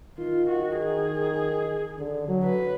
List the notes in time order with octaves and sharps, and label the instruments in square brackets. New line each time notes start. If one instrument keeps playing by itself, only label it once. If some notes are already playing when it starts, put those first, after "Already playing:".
[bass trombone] D#3 [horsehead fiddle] F4
[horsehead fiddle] F#4
G#4
[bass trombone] D3
F#3
[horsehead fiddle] B4